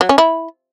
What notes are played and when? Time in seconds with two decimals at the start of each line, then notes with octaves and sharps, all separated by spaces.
0.01 F#3
0.09 C#4
0.18 E4